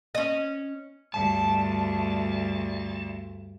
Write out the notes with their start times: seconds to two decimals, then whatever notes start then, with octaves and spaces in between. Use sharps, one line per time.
0.15 C#4 D#5
1.14 D2 G2 A5